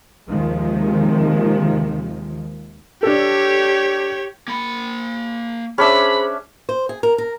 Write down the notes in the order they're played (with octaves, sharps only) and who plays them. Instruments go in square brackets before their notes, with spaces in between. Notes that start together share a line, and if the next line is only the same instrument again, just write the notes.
[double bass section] D#2 C3 D#3 F3 G#3
[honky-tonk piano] D4 A4 [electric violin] G4 C#5
[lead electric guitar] A#3 B5
[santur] C#4 D4 E5 [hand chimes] G#4 C5 [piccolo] B5
[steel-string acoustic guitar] C5
G#4
A#4
A#4